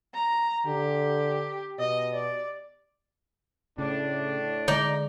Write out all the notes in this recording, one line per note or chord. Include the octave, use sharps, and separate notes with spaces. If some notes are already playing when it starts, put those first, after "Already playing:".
A#5
D3 G4
B2 D#5
D5
A2 C#3 D4
D3 G#3 D#4 D5